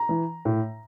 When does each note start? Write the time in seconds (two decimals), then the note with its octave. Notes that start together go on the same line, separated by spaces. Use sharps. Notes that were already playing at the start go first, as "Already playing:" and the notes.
Already playing: A#5
0.09 E3
0.45 A2